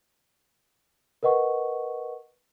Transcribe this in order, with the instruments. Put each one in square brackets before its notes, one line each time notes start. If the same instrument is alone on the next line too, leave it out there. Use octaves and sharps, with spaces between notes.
[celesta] A#4 B4 D#5 F#5 C#6